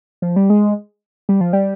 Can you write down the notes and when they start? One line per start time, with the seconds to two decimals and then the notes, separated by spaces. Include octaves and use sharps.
0.22 F3
0.36 G3
0.50 G#3
1.29 G3
1.41 F3
1.53 G3